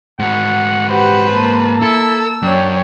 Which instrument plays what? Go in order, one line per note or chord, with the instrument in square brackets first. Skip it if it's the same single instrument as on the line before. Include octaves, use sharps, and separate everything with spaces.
[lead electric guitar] G#2 F#4 [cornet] F#5
[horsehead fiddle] G4 F#5 [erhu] B4 [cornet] C5
[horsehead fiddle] A#3 A5
[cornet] E4 [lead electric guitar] A4 [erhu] E6
[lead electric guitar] F#2 [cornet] D4 [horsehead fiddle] C#5 G5